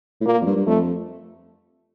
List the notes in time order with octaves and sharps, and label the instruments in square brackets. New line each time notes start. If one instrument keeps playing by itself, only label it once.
[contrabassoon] A2
[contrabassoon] A#2 [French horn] A#3
[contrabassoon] F2
G2
G2
[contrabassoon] F2 [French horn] A3